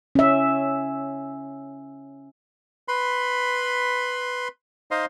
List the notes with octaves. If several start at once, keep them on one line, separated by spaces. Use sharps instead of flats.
C#4 E5
B4 B5 C6
D#4 C5 D#5 F5 C6